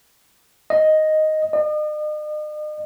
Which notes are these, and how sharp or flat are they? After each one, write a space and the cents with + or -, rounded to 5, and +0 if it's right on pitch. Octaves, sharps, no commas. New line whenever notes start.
D#5 +0
D#5 -45